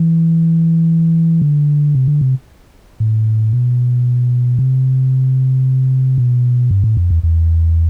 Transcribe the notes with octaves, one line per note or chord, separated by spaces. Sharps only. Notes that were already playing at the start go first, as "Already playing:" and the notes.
Already playing: E3
D3
C3
D3
C3
A2
B2
C3
B2
G2
A2
F2
E2
E2